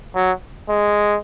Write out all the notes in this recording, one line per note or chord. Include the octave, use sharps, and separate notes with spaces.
F#3
G#3